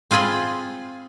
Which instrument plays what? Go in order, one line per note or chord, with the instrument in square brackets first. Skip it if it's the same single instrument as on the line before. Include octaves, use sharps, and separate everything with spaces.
[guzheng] C4 F4 G#4 B5 C6